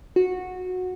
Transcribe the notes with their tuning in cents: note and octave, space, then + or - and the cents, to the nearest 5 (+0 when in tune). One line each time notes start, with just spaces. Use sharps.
F#4 -15